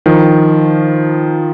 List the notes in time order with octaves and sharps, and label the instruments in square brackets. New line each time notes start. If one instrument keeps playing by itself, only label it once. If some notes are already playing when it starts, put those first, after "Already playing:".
[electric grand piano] D#3 F3